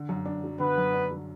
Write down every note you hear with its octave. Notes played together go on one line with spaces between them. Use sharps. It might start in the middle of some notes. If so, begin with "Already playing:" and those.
Already playing: D3
F#2
D4
F#3
D3 B3 B4
F#2
D4
F#3